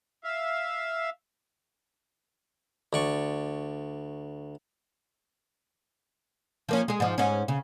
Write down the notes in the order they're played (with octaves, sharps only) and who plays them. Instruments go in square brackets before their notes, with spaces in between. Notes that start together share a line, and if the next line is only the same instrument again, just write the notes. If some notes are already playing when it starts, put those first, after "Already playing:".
[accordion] E5 F5
[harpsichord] D2 D5 C#6
[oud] F3 A#3 C#4
G#3 G#4
G#2 F3
G#2 C#4
C#3